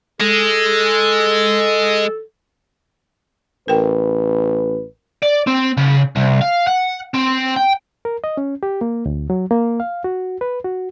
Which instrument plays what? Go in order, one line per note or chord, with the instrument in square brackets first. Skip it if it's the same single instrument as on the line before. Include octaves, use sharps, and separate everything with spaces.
[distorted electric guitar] G#3 [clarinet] A4
[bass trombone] A1 [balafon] A#4 G5 [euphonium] B4
[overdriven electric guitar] D5
C4
C#3
C2
F5
F#5
C4
G5
[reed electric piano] A#4
D#5
C#4
G4
A#3
D2
F#3
A#3
F5
F#4
B4
F#4